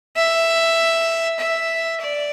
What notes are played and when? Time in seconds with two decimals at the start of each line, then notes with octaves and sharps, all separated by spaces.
0.17 E5
1.39 E5
2.01 D5